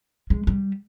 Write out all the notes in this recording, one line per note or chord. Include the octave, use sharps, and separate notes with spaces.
G#3
G3